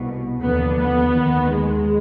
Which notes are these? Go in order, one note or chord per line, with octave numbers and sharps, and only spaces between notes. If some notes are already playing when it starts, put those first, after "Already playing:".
Already playing: C2 B2
D#2 D3 F3 B3
B3
D#2 D#3
G#3